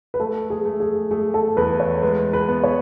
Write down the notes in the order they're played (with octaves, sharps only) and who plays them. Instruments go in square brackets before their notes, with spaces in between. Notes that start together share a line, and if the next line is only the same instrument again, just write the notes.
[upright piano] B4
[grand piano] A3 [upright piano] A4
[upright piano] G#4
[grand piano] A3
[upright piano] G#4
[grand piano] A3 [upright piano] G#4
[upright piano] A4
[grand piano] E2 [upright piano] B4
[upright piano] C#5
[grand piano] G#3 [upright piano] B4
[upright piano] B4
[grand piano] B3
[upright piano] C#5